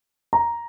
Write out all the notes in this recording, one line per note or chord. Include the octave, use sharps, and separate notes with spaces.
A#5